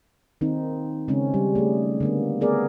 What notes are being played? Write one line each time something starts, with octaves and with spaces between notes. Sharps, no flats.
D#3 A#3 C4 D#4
C#3 G#3 C4 C#4
G3
A3 G#4
D3 A#3 B3
A3 B3 G#4 A#4 D5